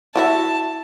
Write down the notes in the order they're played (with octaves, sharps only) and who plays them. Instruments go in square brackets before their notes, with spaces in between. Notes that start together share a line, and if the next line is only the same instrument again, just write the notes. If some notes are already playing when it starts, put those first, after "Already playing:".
[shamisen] E4 F#4 E5 [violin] A5